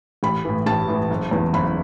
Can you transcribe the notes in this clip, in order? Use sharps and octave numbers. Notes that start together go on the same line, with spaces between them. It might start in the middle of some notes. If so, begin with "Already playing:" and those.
A1 B5
A2 E3
A1 A5
A2 E3
F#1
E2 E3
F#1 B5